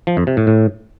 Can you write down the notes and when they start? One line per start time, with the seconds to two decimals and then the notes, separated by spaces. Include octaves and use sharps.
0.07 F3
0.17 F2
0.27 C3
0.37 A2
0.47 A2